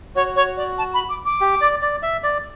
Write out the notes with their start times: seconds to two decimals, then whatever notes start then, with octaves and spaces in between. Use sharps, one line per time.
0.16 F#4 C#5
0.36 C#5
0.57 D5
0.78 A5
0.94 B5
1.09 D6
1.25 D6
1.41 G4
1.61 D5
1.82 D5
2.03 E5
2.23 D5